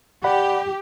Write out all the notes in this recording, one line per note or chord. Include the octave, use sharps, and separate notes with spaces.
G4 D5 F#5 B5